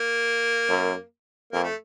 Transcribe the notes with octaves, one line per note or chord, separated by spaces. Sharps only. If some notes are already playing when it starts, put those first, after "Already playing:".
Already playing: A#3
F#2
F2 A#3
A3